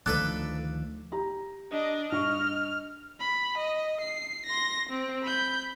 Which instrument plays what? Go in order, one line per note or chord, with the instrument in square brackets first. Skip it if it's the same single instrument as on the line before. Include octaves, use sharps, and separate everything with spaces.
[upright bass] D2 [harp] D#3 F3 D#4 [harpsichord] D4 A4 B4 [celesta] F#6
[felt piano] G4 A#5
[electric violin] D4 [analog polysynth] D#5
[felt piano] G2 C#6 [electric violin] F6
[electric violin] B5
D#5
C7
C6 A#6
C4
B5 G6